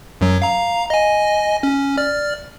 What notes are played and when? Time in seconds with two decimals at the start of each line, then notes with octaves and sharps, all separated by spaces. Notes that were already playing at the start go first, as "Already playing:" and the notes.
0.21 F#2 F#3
0.42 F5 A#5
0.90 D#5 G#5
1.63 C#4
1.98 D5 F6